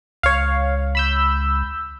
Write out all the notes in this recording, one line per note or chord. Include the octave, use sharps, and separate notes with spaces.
C#2 C#5 F5
B5 E6 G6